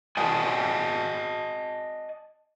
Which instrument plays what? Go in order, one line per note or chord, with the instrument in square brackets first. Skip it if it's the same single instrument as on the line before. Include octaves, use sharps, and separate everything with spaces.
[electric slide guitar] D5 D#5 F#5 G#5 A5